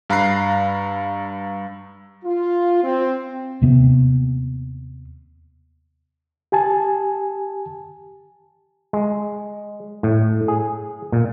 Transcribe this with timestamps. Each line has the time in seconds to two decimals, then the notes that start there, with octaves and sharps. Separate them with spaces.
0.10 G2 F5 A#5 B5 F#6 C7
2.25 F4
2.82 C4
3.62 D#2 C3 B3 C4
6.52 G4 G#5 A5
8.93 G#3
10.03 A2
10.48 G#4
11.12 A#2